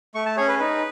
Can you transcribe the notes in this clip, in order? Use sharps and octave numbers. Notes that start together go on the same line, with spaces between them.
A3 C#6
A5
C#4 G#4 C#5
B4
D#4 B4